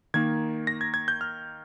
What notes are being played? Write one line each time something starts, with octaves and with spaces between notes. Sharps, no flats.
D#3 A#3 D#4 G#6
A#6
G#6
G#6
G6
F6